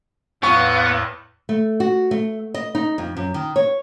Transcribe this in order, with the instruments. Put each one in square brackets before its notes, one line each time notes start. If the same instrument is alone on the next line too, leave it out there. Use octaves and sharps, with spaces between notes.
[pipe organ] E2 A2 B4 [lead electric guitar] B3 [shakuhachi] F5 [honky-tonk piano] C#6
[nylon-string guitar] A3
F#4
A3
D#5
D#4
F2
F#2
D#3
C#5